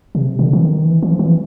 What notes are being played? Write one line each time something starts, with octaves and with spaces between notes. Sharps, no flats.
C3
D3
E3
D#3
E3
E3
F3
E3